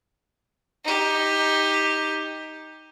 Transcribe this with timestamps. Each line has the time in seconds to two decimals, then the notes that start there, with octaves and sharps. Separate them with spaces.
0.84 D#4 G4